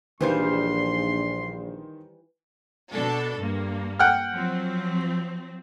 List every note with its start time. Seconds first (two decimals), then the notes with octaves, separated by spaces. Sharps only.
0.21 A#1 D#3 E3 G3 C5 F5 C6 G6
2.92 B2 D4 A4
3.39 G2 A#3
3.99 F#5 G5 F6
4.32 F3 F#3 C4